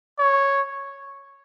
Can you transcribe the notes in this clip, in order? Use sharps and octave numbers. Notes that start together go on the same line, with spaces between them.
C#5